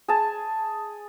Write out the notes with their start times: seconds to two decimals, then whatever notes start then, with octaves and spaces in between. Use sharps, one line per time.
0.08 G#4 A5